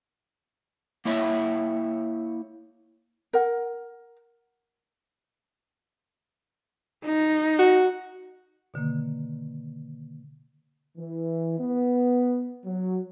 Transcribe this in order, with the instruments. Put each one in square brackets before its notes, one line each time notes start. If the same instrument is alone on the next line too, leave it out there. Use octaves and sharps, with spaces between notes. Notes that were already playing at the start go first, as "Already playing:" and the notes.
[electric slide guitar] A#3 E4 C#5 E5
[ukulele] A#4 F#5
[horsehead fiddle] D#4
[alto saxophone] F#4
[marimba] B2 D3 D#3 A#3
[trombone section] E3
B3
F#3